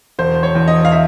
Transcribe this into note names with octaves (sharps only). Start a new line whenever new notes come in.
E1 C5
C#5
E2
D#5
F5
E5